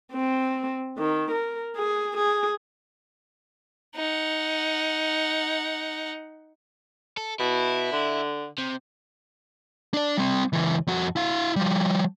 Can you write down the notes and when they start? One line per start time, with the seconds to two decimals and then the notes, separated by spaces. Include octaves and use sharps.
0.13 C4
0.98 D#3
1.31 A#4
1.76 G#4
2.17 G#4
3.96 D#4 F#5
7.17 A4
7.39 B2 E4
7.92 D3
8.58 C3
9.94 D4 D5
10.17 G3 C4
10.53 C#2 E3
10.87 F2 F#4
11.16 E4 F5
11.56 F3 G3